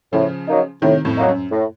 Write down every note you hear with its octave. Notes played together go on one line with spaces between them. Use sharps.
A2 C#3 F3
F#3 A#3 D#4
A2 C3 D#3
F2 A2
F#3 A#3 D#4
F#2
A2